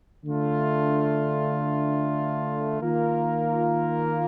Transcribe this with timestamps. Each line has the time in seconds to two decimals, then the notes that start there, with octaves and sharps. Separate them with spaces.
0.25 D3 A3 D4 F4
2.81 D#3 A#3 F4 A#4